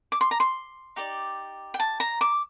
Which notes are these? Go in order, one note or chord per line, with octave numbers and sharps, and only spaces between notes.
D6
C6
A#5
C6
D#4 G4 D5
G5
A5
A#5
D6